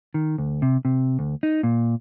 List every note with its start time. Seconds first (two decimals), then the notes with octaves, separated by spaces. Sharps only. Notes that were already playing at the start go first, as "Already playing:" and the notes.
0.14 D#3
0.38 D2
0.62 C3
0.85 C3
1.19 D2
1.43 D#4
1.63 A#2